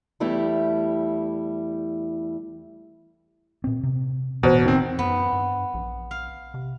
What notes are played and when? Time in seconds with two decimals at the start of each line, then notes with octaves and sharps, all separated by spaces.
0.20 E2 G3 A3 E4 G4
3.64 A#2 C4
3.83 C3
4.43 E1 A1 B2 E3 F#4 C5 A#5
4.65 D#3 C4
4.99 F#2 B3
5.33 G2
5.74 A#1
6.11 F5
6.54 C3